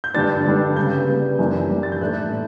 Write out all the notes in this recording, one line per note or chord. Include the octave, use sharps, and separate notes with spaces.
G6
G2 D3 G3 D4 A6
G2 D3 G3 D4
C#3 G3 B3 G6
C#3 G3 B3
F#2 E3 G3 D4
F#2 E3 G3 D4
A6
G6
A2 E3 A3 D4 F#6
A2